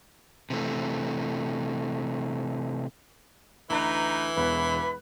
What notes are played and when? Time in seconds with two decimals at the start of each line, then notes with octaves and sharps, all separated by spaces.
0.50 C3 E3 A3
3.70 D2 E3 D#4 B4 A#5
4.37 E1 E2 B3 B4 B5 F#6